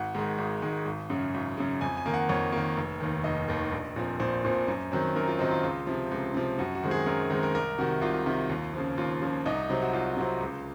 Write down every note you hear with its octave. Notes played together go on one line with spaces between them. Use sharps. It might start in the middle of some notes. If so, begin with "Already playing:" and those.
Already playing: G#1 F#5
G#2 D#3 G#3
G#1
G#2 D#3 G#3
G#1
F#2 C#3
G#1
F#2 C#3
F2 G#5
G#5
D#3 A#3
F#5
F2 C#5
D#3 A#3
F1
D#2 D#3
F1 D#5
D#2 D#3
A#1
A#2 F3 C4
A#1 C5
A#2 F3 C4
F#2
D#3 F#3 C4
F#2 A#4
F4
D#3 F#3 C4 D#4
F4
C#2
C3 F3
C#2
C3 F3
F#2 F#4
F#4
D#3 G#3 C4
G#4
F#2 A#4
D#3 G#3 C4 A#4
A#4
C2 A#4
C3 D#3 F#4
C2 F4
C3 D#3
D#2
C#3 F3
D#2 F4
C#3 F3
C2 D#4
C3 F#3 C4
F#4
C2 F4
C3 F#3 C4
C#2